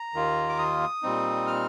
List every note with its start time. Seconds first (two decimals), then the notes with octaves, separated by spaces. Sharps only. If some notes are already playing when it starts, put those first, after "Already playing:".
Already playing: A#5
0.13 D#2 D#3 A#3 F4
0.49 D6
0.58 D#6
1.03 A#2 G3 C4 D#4
1.47 F6